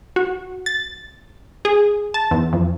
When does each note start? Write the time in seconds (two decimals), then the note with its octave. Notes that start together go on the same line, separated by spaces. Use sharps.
0.16 F#4
0.66 A6
1.65 G#4
2.14 A5
2.31 E2
2.53 F2